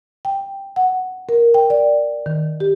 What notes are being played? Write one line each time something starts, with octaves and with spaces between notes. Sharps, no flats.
G5
F#5
A#4
G5
D5
D#3
G4